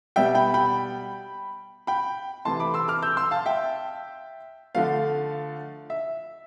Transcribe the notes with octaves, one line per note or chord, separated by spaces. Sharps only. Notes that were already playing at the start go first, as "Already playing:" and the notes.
B2 G3 B3 E5 G5
G5 B5
G5 B5
G5 B5
C3 E3 A3 A5 C6
B5 D6
C6 E6
D6 F6
E6 G6
C6 E6
F5 A5
E5 G5
D3 F3 A3 F5
E5